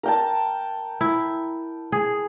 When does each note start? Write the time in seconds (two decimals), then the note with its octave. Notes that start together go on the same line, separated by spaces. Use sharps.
0.03 A#4 G5 A5
1.01 E4
1.92 G#4